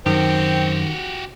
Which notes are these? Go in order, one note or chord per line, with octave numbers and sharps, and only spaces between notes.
F#2 D#3 F#3 C4 F#4 G4